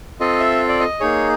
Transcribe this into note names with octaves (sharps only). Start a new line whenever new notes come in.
C4 F4 A4 D#5
E5
D5
D#5
A#3 D#4 G#4 C#5